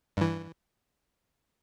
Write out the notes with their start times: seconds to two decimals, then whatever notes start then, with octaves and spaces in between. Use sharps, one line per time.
0.17 G2 E3